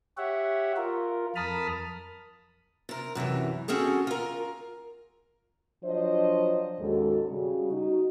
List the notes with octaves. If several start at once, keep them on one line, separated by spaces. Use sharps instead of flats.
G4 C#5 E5 F#5
F4 A#4
F2 A#4 A5 B5 D#6 F6
C3 A#4
F#2 C3 D#3 E3
C4 C#4 F#4 G#4 A4
F4 A#4
F3 F#3 D4 C5 C#5 D#5
D#2 G#2 G#3 C#4 F#4 A4
C#3 G3 F#4
D#4 F#4